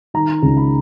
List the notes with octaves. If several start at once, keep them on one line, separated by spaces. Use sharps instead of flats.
D#3 A#5
C#2
B5